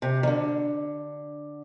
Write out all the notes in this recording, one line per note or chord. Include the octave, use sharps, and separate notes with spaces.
C3
D#3
D3